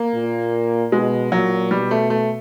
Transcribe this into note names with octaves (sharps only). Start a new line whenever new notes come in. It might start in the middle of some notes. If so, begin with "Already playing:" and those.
Already playing: A#3
A#2
B2 G#3
A#2 F#3
B2 G3
A3
A3